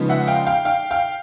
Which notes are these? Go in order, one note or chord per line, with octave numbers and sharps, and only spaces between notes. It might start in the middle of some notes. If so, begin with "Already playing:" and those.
Already playing: C#3 F3 G#3 B3 D#4
E5 F#5
F5 G5
F5 G5
F5 G5
F5 G5